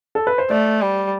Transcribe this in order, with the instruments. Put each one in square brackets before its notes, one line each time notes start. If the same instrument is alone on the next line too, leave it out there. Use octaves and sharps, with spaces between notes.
[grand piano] A4
B4
C5
[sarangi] A3 [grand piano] D5
[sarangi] G3